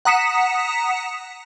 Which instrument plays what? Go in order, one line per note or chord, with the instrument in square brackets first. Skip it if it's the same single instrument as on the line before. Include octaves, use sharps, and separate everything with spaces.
[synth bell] F#5 A#5 D#6 B6 C#7 E7